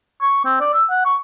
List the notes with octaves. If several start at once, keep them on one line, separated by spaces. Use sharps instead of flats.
C#6
C4
D5
E6
F#5
C#6